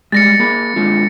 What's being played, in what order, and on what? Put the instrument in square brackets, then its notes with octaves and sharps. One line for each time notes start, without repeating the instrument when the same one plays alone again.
[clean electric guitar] G3 G#3 [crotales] A6 A#6 C#7
[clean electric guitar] A#3 G#4 B5
G#3 D4 F4